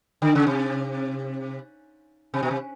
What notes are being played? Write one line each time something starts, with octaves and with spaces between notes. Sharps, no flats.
D3
C#3
C3
C3
B2
C3